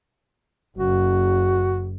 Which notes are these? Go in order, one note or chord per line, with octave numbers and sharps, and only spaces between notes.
F#1 F#4